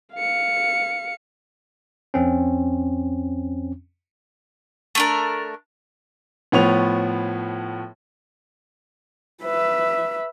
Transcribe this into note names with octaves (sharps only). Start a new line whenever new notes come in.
F5 C#7
F2 C4 C#4
A3 D4 A#4
A2 F3 B3 C#5 C#6 F7
B4 E5